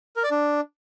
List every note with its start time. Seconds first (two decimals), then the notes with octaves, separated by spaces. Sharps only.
0.16 A#4
0.24 D5
0.31 D4